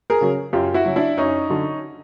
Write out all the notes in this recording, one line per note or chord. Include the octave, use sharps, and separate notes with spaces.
G#4 A#4
C#3 F#3
F#2 F4 G4
E4 F#4
C#3 F#3
D4 E4
F#2 C#4 D#4
D3 F#3